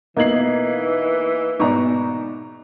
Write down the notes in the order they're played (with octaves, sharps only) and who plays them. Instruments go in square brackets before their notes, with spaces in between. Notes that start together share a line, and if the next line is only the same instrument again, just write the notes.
[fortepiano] B2 [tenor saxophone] E3 [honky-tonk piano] A#3 D#4 F#7 [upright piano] D#5 G#6 C7
[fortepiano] G#2 B2 [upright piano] D5 A#5 C#6